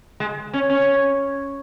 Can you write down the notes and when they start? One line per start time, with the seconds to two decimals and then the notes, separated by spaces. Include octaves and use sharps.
0.20 G#3
0.54 C#4
0.70 C#4